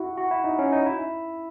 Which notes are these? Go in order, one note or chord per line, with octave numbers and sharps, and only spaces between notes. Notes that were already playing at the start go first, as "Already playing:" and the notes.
Already playing: E4 F#4
F#4
E4
D#4
C#4
D#4
E4